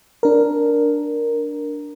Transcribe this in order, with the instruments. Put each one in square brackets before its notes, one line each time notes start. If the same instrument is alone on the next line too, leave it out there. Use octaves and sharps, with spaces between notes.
[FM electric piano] D4 A#4